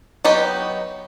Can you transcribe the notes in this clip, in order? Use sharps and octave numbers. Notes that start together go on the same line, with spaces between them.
F#3 B3 D#4 G4